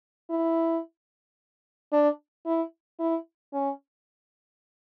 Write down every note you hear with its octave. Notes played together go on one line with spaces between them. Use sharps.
E4
D4
E4
E4
C#4